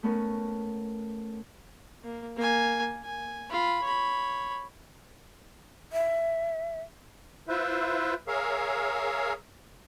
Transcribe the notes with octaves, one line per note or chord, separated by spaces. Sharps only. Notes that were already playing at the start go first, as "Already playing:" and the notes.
A3 B3 C#4 A#4
A#3
A#3 G#5
G#5
F4 B5
C#5 B5
E5
E4 F4 B4 C5 E5
G#4 A#4 C#5 E5 F5